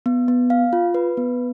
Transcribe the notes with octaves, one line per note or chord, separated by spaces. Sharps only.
B3
B3
F5
F4
B4
B3